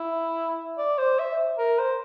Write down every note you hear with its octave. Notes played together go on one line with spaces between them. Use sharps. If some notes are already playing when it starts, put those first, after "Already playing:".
Already playing: E4
D5
C5
E5
A#4
C5